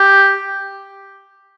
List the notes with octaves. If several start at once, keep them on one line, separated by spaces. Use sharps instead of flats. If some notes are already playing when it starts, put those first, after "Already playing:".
Already playing: G4